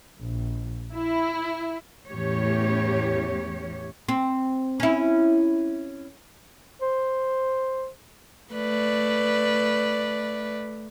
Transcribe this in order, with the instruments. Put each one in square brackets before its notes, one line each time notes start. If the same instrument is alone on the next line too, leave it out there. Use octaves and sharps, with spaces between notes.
[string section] A#1
E4
[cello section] E2 A2 E3 C#4 G4 C#5
[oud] C4
C#4 E4
[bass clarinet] C5
[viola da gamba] A3 B4 D5